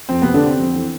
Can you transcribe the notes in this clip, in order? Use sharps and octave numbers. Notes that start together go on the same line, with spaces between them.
F2 C4
C3 B3
D3 D4
C3 C4
F2 C4
E3